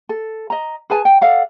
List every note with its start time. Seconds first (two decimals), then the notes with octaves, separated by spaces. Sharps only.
0.09 A4
0.50 D#5 A#5
0.90 G#4 B4 G#5 A5
1.05 G5
1.21 A4 D5 F5 F#5